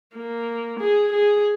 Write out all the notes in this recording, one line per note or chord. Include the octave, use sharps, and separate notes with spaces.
A#3
G#4
G#4